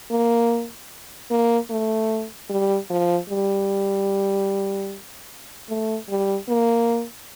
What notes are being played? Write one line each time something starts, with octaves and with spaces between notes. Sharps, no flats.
A#3
A#3
A3
G3
F3
G3
A3
G3
A#3